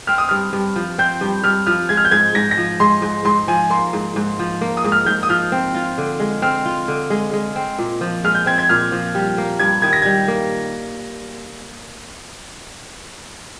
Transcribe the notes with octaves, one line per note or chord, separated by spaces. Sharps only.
C4 F6
D#6
G2 F6
G2
F3
C4 G6
G2
G2 F6
F3 F6
G#3 G#6
F6
G6
G#2 G#6
G#2 A#6
A#6
F3
G#3 C6
G#2
G#2 C6
F3 G#5
A#3 C6
G#2
G#2
F3
A#3
D#6
G#2
F6
G#2 G6
D#6
F3 F6
C4
F4
D3
G#3
C4 F6
F4
D3
G#3
G#3
C4
A#2
F3
G#3 F6
G6
C4 G#6
G#6
A#2 F6
F3
G3
A#3
G2 G#6
D#3 G#6
A#6
G3 G#6
A#3